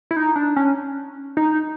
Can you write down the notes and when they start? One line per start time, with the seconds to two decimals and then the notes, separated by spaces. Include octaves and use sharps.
0.11 E4
0.16 D#4
0.36 D4
0.56 C#4
1.37 D#4